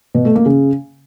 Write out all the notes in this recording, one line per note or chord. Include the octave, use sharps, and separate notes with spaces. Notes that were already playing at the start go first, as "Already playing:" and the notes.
B2
A3
A#3
C#3